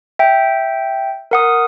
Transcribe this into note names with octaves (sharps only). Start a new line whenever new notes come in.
E5 G5
A#4 F#5 D#6